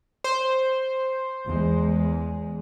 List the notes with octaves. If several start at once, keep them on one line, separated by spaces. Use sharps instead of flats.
C5
E2 G#3